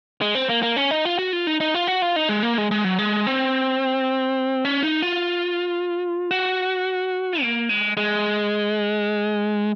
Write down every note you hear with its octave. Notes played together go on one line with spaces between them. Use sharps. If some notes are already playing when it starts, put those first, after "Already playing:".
G#3
C4
A#3
A#3
C#4
D#4
F4
F#4
F4
D#4
D#4
F4
F#4
F4
D#4
G#3
A#3
G#3
G#3
F#3
G#3
C4
C#4
D#4
F4
F#4
A#3
G#3
G#3